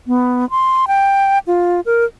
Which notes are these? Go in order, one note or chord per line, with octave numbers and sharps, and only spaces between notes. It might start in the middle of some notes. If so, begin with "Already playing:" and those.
B3
C6
G5
F4
A#4